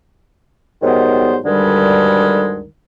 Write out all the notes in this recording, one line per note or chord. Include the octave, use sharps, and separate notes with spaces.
G#2 D#3 F#3 G3 B3 C5
D2 G2 D3 D#3 G3 G#3